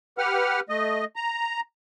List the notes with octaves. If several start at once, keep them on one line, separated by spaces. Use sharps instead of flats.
G4 B4 F#5 F6
A3 D#5
A#5